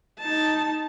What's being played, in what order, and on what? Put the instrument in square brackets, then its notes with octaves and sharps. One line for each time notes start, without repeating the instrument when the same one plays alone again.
[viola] D#4 A5